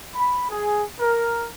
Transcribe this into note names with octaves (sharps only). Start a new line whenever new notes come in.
B5
G#4
A#4